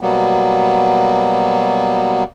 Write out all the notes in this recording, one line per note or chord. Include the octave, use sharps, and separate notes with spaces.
B2 F#3 G3 A#3 B3